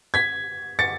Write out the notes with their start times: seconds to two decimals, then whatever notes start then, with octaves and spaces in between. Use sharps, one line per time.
0.14 G#6 B6
0.79 A6 C#7